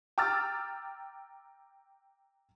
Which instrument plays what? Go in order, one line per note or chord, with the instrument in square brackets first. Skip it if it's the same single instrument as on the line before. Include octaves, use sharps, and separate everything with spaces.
[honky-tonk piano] G5 A#5 D6 E6 F6 A6